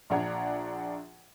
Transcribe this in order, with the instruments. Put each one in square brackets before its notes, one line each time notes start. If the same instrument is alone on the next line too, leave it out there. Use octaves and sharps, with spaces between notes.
[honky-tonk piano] A#1 F3 D4 F#5 A#5 G#6